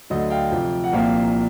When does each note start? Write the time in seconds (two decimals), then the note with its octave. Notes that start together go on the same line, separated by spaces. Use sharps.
0.10 D2 D3 F#3 A3 D#5
0.30 F5 G5
0.52 F2 C3 F3
0.84 F#5
0.92 C2 A#2 F3 A#3 F5 G5